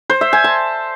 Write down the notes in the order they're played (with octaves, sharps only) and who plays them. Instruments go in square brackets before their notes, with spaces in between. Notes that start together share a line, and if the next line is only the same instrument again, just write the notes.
[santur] C5
E5
G#5
A5